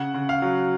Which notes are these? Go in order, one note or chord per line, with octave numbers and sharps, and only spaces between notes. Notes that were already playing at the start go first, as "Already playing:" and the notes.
Already playing: C#3 F#5
C#3
F5
F#3